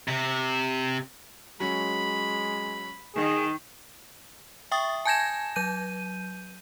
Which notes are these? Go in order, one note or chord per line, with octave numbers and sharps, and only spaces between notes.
C3
F#3 G#3 C#4 B5
D#3 G#4
E5 G5 C#6 D#6 A6
G#5 A5 G6 G#6 A#6 E7
F#3 G6 D#7